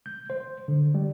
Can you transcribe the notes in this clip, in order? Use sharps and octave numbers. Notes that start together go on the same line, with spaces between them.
G6
C5
D3
G3